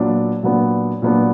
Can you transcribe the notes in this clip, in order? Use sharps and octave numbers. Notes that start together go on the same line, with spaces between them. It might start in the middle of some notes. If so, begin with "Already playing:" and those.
Already playing: A#2 F#3 B3 D4
A#2 F#3 B3 D4
A#2 F#3 B3 D4